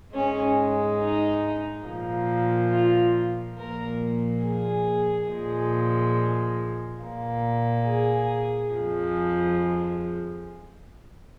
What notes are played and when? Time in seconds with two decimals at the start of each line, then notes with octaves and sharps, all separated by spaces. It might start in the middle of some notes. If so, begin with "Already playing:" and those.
0.13 G#2 G#3 C#4
0.99 D#4
1.85 A#2 F3 A#3
2.71 F4
3.57 A#2 F3 A#3 A#4
4.43 G#4
5.28 A#2 F3 G#3
7.00 A#2 A#3
7.86 G#4
8.71 F2 F3 G#3